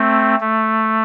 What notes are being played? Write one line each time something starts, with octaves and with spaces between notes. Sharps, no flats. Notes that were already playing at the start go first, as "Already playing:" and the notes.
Already playing: A3 C4
A3